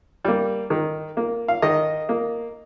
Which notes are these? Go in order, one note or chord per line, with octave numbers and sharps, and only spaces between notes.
G3 A#3
D#3
A#3
F5
D#3 D#5
A#3